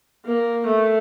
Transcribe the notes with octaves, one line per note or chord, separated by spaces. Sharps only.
A#3
A3